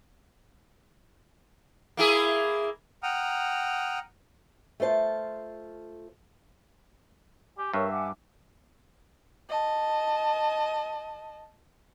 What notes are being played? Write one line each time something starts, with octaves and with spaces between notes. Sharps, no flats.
A#3 E4 G#4
F#5 G5 A#5 D#6 F6
A3 F4 C5 A5
G4 G#5
G2 A#4 C#5 E5 C#6
F#5 G#5 D6
D#5 A5